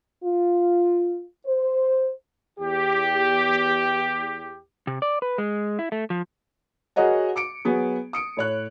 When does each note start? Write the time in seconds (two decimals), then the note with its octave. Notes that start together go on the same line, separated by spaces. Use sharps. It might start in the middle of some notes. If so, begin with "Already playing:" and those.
0.24 F4
1.47 C5
2.59 E2 G4
4.87 C3
5.02 D5
5.22 B4
5.38 G#3
5.79 E4
5.92 A3
6.10 F3
6.96 F#4 G#4 A#4 C#5 D#5 F#5
7.36 D6 C#7 D7
7.65 F#3 B3 G#4
8.13 D#6 C#7 D7
8.37 A2 C#5 F#6